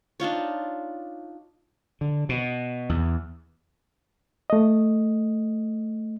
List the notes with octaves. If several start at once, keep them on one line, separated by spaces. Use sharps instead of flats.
D4 D#4 F4 C#5
D3
B2
E2
A3 D#5